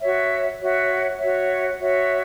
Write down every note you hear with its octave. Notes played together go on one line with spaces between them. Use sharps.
F#4 C#5 E5
F#4 C#5 E5
F#4 C#5 E5
F#4 C#5 E5